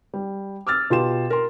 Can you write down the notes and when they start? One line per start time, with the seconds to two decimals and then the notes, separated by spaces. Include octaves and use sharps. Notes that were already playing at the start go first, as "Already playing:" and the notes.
0.14 G3
0.67 D6 E6 F6 A6
0.90 B2 F4 G4 C6 E7
1.30 A#4 C6